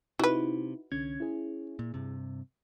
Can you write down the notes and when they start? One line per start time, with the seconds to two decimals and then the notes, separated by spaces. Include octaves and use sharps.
0.19 C3 D#4 E4 F#4 B4
0.92 C2 D3 C#4 G#6
1.20 E4 G#4
1.79 A#2
1.94 G2 C3